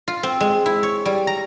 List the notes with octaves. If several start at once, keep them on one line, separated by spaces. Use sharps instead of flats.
F4
C4
G#3
E4
C#5
G3
A#5